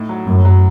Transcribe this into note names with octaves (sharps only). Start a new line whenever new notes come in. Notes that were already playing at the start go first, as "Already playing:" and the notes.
Already playing: A2 D#4
F#3
F#2 A2
F#3